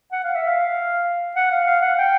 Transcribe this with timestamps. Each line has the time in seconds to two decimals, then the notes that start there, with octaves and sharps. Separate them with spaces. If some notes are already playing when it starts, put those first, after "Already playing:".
0.12 F#5
0.24 F5
0.35 E5
0.48 F5
1.36 F#5
1.52 F5
1.67 F5
1.82 F#5
1.98 G5